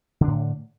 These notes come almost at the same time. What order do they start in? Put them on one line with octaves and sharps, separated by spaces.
D3 D4 A2